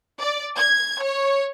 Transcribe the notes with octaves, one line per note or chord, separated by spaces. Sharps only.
D5
G#6
C#5